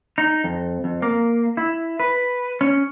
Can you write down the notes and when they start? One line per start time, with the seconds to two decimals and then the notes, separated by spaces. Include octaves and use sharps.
0.18 D#4
0.44 F2
0.84 F2
1.02 A#3
1.57 E4
2.00 B4
2.61 C#4